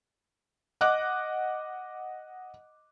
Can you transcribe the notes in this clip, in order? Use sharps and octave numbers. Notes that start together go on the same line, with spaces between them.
D#5 F#5 D6 F#6